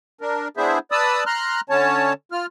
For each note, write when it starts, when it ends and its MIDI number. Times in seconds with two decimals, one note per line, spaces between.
0.21 0.48 62
0.21 0.48 70
0.57 0.79 59
0.57 0.79 62
0.57 0.79 64
0.57 0.79 68
0.57 0.79 72
0.57 0.79 76
0.92 1.24 71
0.92 1.24 74
0.92 1.24 81
0.92 1.24 83
0.92 1.24 87
0.92 1.24 88
1.26 1.61 82
1.26 1.61 84
1.26 1.61 89
1.26 1.61 90
1.69 2.13 50
1.69 2.13 61
1.69 2.13 73
1.69 2.13 81
2.32 2.46 65
2.32 2.46 89